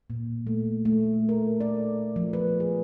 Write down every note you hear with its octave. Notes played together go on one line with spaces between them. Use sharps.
A#2
A3
A3
A#4
D5
F3
B4
G#4